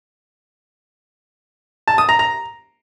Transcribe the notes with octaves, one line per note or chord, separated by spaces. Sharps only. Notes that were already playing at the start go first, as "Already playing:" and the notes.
A5
D#6
A#5
A#5